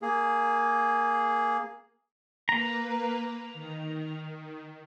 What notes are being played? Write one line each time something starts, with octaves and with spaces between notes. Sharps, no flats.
A#3 G#4
A#3 B4 A#5
D#3